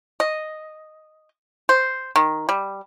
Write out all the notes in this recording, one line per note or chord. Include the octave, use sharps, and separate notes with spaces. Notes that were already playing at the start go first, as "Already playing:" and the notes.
D#5
C5
D#3
G3